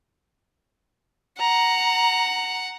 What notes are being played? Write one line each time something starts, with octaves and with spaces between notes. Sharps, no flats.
F#5 A#5